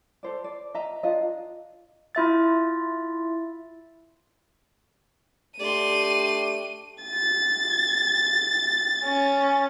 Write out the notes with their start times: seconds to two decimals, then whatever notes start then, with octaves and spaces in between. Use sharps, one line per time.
0.23 A4 C5 D5
0.44 D5
0.74 D#5 E5 A#5
1.03 D4 F4 D#5
2.15 E4 F4 E5 A6
5.60 A3 D4 G4 D5 C6 D#7
7.02 A6
9.04 C#4